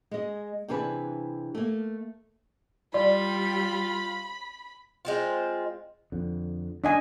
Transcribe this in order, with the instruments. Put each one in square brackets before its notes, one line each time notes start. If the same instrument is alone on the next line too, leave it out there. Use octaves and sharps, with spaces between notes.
[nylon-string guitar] G#3 D#5
C3 E3 D4 G#4 B4
A3 A#3
[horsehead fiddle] G3 [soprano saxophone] F4 [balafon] D5 [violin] B5
[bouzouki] G#3 C4 F4
[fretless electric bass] F2 D3
[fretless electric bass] D3 [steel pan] D4 D#5 G#5